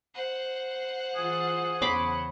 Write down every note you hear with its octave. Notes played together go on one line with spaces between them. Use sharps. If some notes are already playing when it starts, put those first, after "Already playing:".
C5 F#5
E3 F4 G#4
E2 C#3 C#5 B5 C6 D6